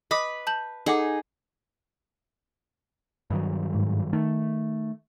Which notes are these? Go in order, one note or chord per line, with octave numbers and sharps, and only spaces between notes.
B4 D#5 B5 D6 D#6
A5 G6 F#7
D#4 G#4 A4 F#5 D6
G2 D#3 F#3
G#2
D#3 A3